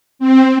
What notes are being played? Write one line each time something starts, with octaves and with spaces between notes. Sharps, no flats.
C4